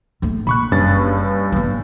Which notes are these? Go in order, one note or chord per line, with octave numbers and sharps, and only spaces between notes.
D1 A3
A#2 B5 C#6 F#6
F#1 G2 C#4 A6
A3 B3
G#2